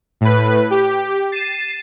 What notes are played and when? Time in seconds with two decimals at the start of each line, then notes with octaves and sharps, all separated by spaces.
0.21 A2 B4
0.70 G4
1.32 A6 C7 D#7 E7